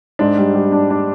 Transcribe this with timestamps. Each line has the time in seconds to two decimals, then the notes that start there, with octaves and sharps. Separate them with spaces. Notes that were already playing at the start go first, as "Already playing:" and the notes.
0.19 G#2 D4
0.38 G3
0.55 G3
0.72 D4
0.90 D4